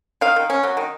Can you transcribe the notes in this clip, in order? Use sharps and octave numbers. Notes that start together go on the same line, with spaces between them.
D#3 F5
D#3
C#4
F#3
D#3